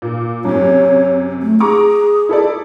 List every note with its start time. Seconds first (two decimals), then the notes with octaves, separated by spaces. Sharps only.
0.02 A#2
0.45 F#2 C3 C#5
1.42 A3
1.60 G#4 A#5 C#6 D6
2.29 E4 A4 D5